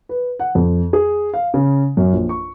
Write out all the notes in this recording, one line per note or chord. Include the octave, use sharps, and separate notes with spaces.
B4
F#5
F2
G#4
F5
C#3
F#2
A#1
C#6